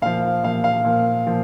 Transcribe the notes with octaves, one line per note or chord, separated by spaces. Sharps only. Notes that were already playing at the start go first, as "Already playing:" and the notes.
A#2 F3 F5
A#2 F3 F5
F5
A#2 F3
A#2 F3